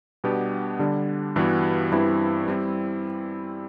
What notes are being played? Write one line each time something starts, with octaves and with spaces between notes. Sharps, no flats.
B2 G3 B3 D4 G4
D3 G3 D4
G2 E3 G3 B3 F#4
G2 E3 G3 C4 E4
G3 C4 E4